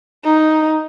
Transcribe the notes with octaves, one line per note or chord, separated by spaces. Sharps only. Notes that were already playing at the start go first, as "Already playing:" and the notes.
D#4